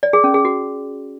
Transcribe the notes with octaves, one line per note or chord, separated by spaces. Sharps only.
D5
G#4
C#4
G#4
F#4